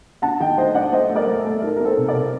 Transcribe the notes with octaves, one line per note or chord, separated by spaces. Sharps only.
D4 F#5 A5
D#3 D#5 G5
A3 C5 D#5
D4 D5 F#5
A3 C5 D#5
A3
A#4 D5
A3
A4
A3
D#4 A#4
C4 A#4
A4 C5
C3
A#4 D5
C3